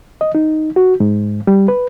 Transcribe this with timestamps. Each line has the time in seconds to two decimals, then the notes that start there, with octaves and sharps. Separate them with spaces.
0.21 D#5
0.35 D#4
0.76 F#4
1.00 G#2
1.47 G3
1.68 B4